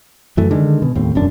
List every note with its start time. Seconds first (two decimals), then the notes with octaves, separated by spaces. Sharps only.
0.37 F#2 E3 A3
0.51 D3 D#3 G#3
0.82 B2
0.95 D#2 A2 C4
1.15 E1 F#2 D4